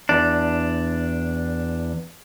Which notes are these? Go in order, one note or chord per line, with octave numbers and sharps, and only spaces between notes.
E2 D4